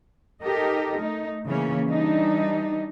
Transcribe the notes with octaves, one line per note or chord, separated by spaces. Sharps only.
D#4 G4 A4 A#4 D#5
A3 D#4
C#3 E3 A#3 C#4
E3 G3 D4 D#4